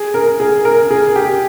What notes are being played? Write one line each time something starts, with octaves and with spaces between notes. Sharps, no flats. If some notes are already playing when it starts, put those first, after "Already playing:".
Already playing: G#4
A#4
G#4
A#4
G#4
G4